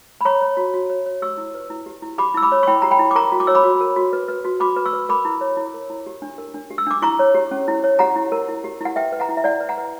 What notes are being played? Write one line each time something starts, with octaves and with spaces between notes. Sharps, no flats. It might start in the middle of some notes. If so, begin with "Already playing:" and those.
B5
C#5 A#5 C#6
C#5
F#4
F#4
C#5
C#5
G4 C#6 E6
E4
B4
E4
G4
E4
G4 B5 D6
E4 E6
B5 D6
C#5
C#6
E4 G5 B5
G4 A#5
G5 B5
E4
D6
A#4 A#5 C#6
F#4
D6
C#5 E6
B5 D6
F#4
A#4
F#4
B4
B4
F#4
F#4 B5 D6
B4
C#6 E6
B4
A#4 B5 D6
E4
C#5
E4
A#4
E4
G4
D4
A#4
D4
G4
E6
D4 D6
E4 A#5 C#6
C#5
G4
C#4
E4
C#5
G4 F#5 A#5
E4
A#4
E4
G4
E4 F#5
B4 E5 G5
B4
F#5 A#5
E4
E5
E4 D5 F#5
B4
F#5 A#5
B4